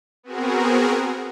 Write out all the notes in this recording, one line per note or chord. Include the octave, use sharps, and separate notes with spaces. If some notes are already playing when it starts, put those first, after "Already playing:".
B3 C4 F#4 G#4 A#4